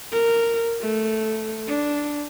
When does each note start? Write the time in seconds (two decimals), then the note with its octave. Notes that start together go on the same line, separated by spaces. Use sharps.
0.12 A#4
0.81 A3
1.67 D4